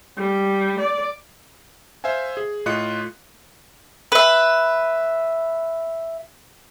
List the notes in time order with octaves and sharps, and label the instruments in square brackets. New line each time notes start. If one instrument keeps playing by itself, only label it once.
[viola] G3
D5
[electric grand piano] C5 E5 F5 G#5
G#4
A2 F4 D#5 F#6 C#7
[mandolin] B4 E5